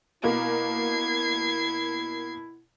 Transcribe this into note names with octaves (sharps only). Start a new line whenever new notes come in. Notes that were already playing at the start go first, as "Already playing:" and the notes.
B2 A#3 E4 G#6 C7